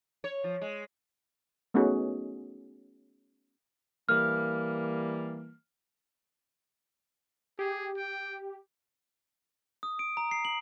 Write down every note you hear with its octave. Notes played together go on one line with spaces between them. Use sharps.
C#5
F3
G#3
A3 B3 C#4 D#4 F#4 G#4
E3 G3 A#3 F6
G4 G#4
G5
D#6
D7
A#5
C7
F#7